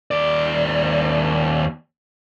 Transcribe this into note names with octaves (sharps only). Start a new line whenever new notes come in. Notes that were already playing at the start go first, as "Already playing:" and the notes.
D#2 D5